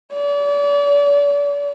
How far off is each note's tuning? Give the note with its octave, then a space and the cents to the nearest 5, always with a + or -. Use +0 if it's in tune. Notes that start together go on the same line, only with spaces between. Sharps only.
D5 -40